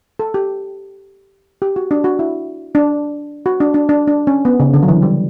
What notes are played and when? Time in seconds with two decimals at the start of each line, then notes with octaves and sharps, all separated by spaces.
0.19 A4
0.34 G4
1.62 G4
1.76 F#4
1.91 D4
2.04 F#4
2.19 E4
2.75 D4
3.46 F#4
3.60 D4
3.74 D4
3.89 D4
4.08 D4
4.27 C#4
4.45 B3
4.60 C#3
4.74 D3
4.83 F#3
4.88 E3
5.02 G3